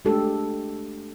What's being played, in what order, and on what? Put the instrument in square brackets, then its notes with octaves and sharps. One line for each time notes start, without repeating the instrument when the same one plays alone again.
[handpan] G#3 A3 D4 G4 A4